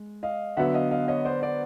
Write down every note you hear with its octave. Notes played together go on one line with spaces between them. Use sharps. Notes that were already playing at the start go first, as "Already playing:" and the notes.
Already playing: G#3
D#5 F5
D3 F#3 B3 E5 F#5
D#5 F5
D#5 F5
C#5 D#5
C5 D5
C5 D5